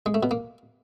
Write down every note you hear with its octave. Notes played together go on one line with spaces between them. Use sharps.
G#3
A3
B2
A#3